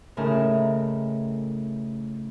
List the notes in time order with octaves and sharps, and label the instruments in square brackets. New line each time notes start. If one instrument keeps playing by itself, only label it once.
[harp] A2 C#3 D#4 A#4 A#5